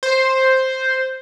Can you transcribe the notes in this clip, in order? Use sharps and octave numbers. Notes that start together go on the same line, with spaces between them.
C5